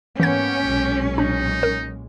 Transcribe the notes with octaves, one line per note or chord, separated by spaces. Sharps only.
G#2 E3 A#3 B3 C#4 G4 G#6
B1 A#2 G#3
D4 D#4
A#4